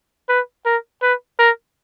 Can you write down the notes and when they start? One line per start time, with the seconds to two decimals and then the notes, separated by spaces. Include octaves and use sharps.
0.29 B4
0.66 A#4
1.02 B4
1.39 A#4